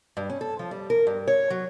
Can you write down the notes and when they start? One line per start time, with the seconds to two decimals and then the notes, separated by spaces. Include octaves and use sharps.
0.17 G2
0.30 C#4
0.41 A4
0.59 F3
0.71 G3
0.90 A#4
1.07 G2
1.28 C#5
1.50 F#3